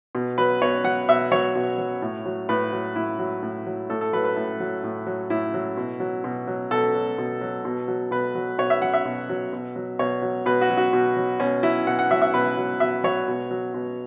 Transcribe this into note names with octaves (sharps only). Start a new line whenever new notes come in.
B2
F#3 B4
B2 C#5
F#3 F#5
B2 E5
F#3 C#5
B2
F#3
A2
F#3
A2 B4
F#3
A2 E4
F#3
A2
F#3
A2 A4
A4
F#3 B4
B4
A2
F#3
A2
F#3
A2 E4
F#3
B2
F#3
B2
F#3
B2 A4
F#3
B2
F#3
B2
F#3
B2 B4
F#3
B2 C#5
E5
F#3 F#5
E5
B2
F#3
B2
F#3
B2 C#5
F#3
B2 B4
F#4
F#3
F#4
B2
F#3
B2 C#4
F#3 E4
B2 F#5
F#5
F#3 E5
E5
B2 B4
F#3
B2 E5
F#3 C#5
B2
F#3
B2